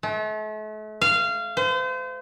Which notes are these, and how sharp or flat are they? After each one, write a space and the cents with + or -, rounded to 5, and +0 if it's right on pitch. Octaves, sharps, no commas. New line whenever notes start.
A3 -40
F5 -20
C5 -35